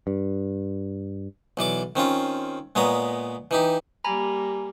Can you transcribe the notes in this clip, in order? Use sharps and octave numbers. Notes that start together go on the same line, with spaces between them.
G2
B1 E3 D5 D6
D#3 C4 C#4 F4
A#2 G#3 B3 C#5 A#5
E3 D#4 G4
G3 A#3 G#5 A#5 B5